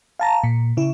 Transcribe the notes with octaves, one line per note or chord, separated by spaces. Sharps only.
F5 A5 A#5
A#2
C#3 E4